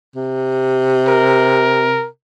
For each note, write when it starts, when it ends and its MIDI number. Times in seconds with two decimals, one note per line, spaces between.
0.15 2.07 48
1.08 2.07 70